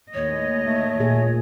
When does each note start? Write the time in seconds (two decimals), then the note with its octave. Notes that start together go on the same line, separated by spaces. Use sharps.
0.14 D#2 A2 C#5 D#5
0.66 A3
1.00 A#2 G#4